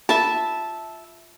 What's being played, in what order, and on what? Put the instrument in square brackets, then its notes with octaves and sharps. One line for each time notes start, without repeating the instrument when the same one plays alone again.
[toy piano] F4 [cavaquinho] E5 A5